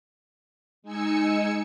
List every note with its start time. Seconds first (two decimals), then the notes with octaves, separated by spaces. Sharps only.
0.82 G#3 D#4 G#5 E6 C#7